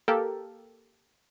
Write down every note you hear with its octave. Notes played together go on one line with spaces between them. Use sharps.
A#3 G4 A4 A#4